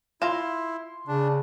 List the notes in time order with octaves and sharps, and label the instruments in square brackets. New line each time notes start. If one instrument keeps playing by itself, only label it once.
[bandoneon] E4 [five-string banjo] F4 A#5 [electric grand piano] C6 E7
[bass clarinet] C#3 [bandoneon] D4